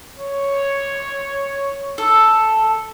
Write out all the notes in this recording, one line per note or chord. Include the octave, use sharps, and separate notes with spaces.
C#5
A4